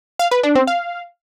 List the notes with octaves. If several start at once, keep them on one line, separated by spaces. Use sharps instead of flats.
F5
B4
D4
C4
F5